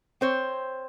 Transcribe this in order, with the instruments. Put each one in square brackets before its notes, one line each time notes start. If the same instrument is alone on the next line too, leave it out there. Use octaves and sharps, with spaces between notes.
[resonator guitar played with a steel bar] C4 C5 C#5